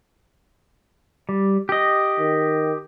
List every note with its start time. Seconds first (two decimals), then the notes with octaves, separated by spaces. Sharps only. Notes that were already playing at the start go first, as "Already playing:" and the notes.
1.29 G3
1.69 G4 D#5
2.19 D#3